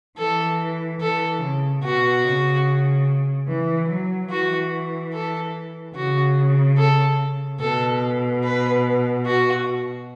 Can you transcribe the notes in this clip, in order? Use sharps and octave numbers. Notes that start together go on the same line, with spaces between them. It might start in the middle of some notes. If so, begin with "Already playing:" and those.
E3 A4
E3 A4
C#3
B2 F#4
C#3
E3
F#3
E3 F#4
A4
C#3 F#4
A4
B2 A4
B4
F#4